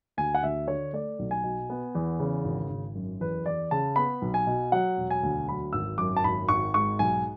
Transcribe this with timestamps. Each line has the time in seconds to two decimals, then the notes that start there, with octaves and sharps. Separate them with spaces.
0.17 D2 G#5
0.35 F#5
0.43 D2 E5
0.68 D3 C#5
0.93 A3 D5
1.19 B1
1.31 G#5
1.44 B2
1.70 B3
1.95 E2
2.20 C#3
2.45 G#1
2.70 G#1
2.95 F#2
3.20 E2 B4
3.46 E2 D5
3.71 C#3 A5
3.96 B3 B5
4.22 B1
4.34 G#5
4.47 B2
4.72 F#3 F#5
4.97 E1
5.10 G#5
5.23 D2
5.47 F#3 B5
5.73 G#1 E6
5.98 F#2 D6
6.17 A5
6.24 G#1 B5
6.49 G#1 C#6
6.74 G#2 C#6
6.99 B1 G#5